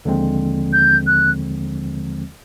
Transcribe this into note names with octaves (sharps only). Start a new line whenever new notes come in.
D#2 D3 F3 G#3 C4
G6
F#6